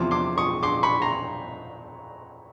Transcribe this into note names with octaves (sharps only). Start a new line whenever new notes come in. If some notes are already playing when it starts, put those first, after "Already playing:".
Already playing: E2 C3 F3 C6 D6
C6 D6
C#6 D#6
C6 D6
B5 C#6
A#5 C6